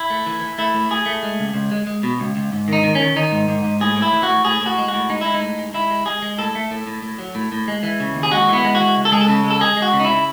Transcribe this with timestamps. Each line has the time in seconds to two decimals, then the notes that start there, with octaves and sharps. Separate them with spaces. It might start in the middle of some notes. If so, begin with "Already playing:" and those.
Already playing: E4
0.10 A3
0.26 E3
0.41 E3
0.58 A3 E4
0.74 A2
0.91 A2 G#4
1.06 A3
1.23 G#3
1.39 C#2
1.54 C#2
1.72 G#3
1.87 G#3
2.03 B2
2.20 C#2
2.36 C#2
2.52 G#2
2.68 D#3 D#4
2.83 D#3
2.95 D#3 C#4
3.16 D#3 D#4
3.32 G#2
3.48 G#2
3.64 G#2
3.80 A2 G#4
3.96 A2
4.02 E4
4.12 E3
4.23 F#4
4.29 A2
4.45 A2 G#4
4.61 A2 F#4
4.78 G#3
4.88 F#4
4.94 A2
5.09 G#3 D#4
5.21 G#3 E4
5.34 D#4
5.41 A2
5.58 G#3
5.74 G#3 E4
5.91 G#3
6.06 G#3 G#4
6.22 G#3
6.38 A2 A4
6.55 A3
6.71 A2
6.87 A2
7.02 A2
7.19 F#3
7.35 A2
7.52 A2
7.68 G#3
7.83 E3
8.00 C#3
8.15 D#2
8.23 G#4
8.32 G#3 F#4
8.49 E3 B3
8.65 G#3
8.75 F#4
8.81 E3
8.97 C#2
9.05 A4
9.12 G#3 G#4
9.21 A4
9.29 C#3
9.44 G#3
9.50 A4
9.61 G#3 G#4
9.77 G#3
9.82 F#4
9.93 C#3
10.00 D#4
10.05 E4
10.10 C#3